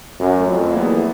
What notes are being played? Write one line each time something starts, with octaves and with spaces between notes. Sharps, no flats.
F#2 F#3
A3
F2
A3
A#3
E2 B3